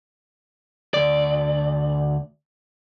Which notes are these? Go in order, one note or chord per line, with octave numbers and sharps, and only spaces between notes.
D2 D5